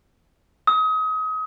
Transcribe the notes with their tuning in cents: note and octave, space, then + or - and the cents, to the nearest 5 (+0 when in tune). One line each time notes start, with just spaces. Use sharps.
D#6 +30